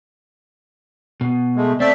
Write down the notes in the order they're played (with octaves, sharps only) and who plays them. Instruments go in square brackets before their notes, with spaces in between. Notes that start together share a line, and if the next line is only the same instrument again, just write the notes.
[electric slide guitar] B2
[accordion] G#3 A3
[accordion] A3 D5 E5 [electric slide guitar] C4